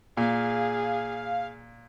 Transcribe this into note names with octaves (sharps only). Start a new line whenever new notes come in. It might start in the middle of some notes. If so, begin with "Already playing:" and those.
A#2 G#4 F5